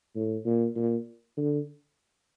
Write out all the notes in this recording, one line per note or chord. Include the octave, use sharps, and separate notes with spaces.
A2
A#2
A#2
D3